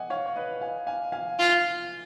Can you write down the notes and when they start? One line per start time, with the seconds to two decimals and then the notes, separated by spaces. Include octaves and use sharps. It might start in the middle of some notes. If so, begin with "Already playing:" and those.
Already playing: D#5 F#5 G#5
0.10 C#5 F5
0.26 C#5
0.36 B4 D#5
0.61 F5 G#5
0.87 F5 G#5
1.12 F5 G#5
1.39 F4